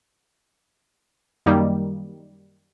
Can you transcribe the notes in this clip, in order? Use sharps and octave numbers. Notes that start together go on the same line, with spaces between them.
F#2 D#3 G3 A#3 D#4